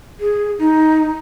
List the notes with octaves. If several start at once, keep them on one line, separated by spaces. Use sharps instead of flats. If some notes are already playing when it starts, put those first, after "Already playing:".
G#4
D#4